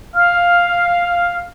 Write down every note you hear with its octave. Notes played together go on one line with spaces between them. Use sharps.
F5